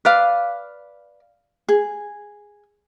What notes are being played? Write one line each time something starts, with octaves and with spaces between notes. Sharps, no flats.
B4 D5 F5
G#4